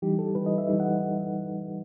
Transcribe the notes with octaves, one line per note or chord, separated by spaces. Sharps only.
E3 G3 D#4 G4
A4
E3 G3 D#4 B4
D#5
E5
E3 G3 D#4
F#5